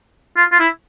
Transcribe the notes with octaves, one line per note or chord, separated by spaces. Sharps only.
F4
F4
E4